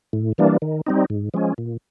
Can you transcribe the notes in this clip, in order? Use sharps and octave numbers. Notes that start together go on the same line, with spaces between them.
A2
E3 G3 A#3 D4
D#3
G3 C4 D#4
G#2
F3 G#3 C#4
A#2